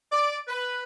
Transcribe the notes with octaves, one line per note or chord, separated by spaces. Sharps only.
D5
B4